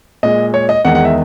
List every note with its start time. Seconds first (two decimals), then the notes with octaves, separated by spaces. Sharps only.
0.23 A#2 G#3 D#5
0.54 C#5
0.69 D#5
0.85 E2 D#3 G#3 F#5
0.95 F#5
1.05 E5